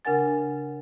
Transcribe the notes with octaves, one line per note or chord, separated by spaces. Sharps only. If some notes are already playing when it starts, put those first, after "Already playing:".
C#3 D4 A#4 F#5 G#5 A6